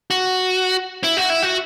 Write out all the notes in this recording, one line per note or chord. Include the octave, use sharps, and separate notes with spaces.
F#4
E4
F#4
E4
F#4